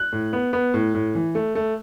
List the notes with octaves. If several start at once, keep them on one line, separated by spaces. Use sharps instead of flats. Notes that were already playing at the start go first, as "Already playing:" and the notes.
Already playing: F#6
A2
B3
B3
A2
A2
E3
A3
A3